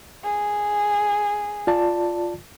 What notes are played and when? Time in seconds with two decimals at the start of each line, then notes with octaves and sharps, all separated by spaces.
0.24 G#4
1.67 F4 D5 A5